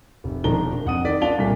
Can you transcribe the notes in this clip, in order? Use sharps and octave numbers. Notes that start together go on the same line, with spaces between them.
F1
E1 D#3 F3 D4 A#5 G7
F2 F#5 D#6 D#7
D#3 D5 B6
D4 F4 D5 A5 F7 G7
C2 A#2 A#3 B6